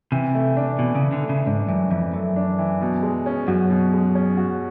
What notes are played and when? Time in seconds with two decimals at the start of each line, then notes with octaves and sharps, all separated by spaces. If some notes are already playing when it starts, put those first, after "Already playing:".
0.12 C3 E3
0.35 A3
0.57 D4
0.79 B2 E3
0.95 C#3
1.02 E3
1.13 D3
1.23 A3
1.29 C#3
1.46 G#2 D4
1.68 F#2 E3
1.91 F2 E3
2.13 F#2 A3
2.36 D4
2.59 E3
2.81 B2
3.03 G#3
3.26 C#4
3.48 F#2 F#4
3.70 B2
3.93 G#3
4.15 C#4
4.37 F#4